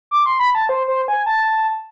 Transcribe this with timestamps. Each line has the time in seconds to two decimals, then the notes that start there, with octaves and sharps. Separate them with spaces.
0.11 D6
0.26 C6
0.40 B5
0.55 A5
0.69 C5
0.88 C5
1.08 G#5
1.26 A5